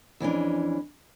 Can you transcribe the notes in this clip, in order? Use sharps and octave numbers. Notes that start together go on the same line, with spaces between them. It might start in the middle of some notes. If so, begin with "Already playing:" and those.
F2 E3 C#4 D4